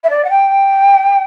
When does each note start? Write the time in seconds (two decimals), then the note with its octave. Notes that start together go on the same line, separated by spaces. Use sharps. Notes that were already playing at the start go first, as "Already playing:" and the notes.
0.03 E5
0.10 D5
0.25 F#5
0.30 G5